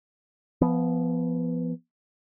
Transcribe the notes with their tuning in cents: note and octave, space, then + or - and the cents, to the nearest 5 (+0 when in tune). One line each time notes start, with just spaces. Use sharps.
F3 -25 B3 +0